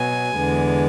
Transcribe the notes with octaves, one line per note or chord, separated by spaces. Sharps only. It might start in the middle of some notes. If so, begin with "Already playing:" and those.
Already playing: B2 F#3 B3 G#5
E2 D3 G#3 B3